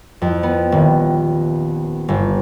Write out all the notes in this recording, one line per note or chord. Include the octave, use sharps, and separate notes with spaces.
F2
B3
D#1
G1